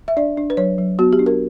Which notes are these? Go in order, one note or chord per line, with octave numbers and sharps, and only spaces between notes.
E5
D4 D5
D4
B4
F#3 C#5
F#3
B3 F#4
G4
D4
A#4